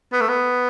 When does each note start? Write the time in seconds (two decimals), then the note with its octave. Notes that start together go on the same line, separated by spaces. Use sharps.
0.13 B3
0.21 A3
0.29 B3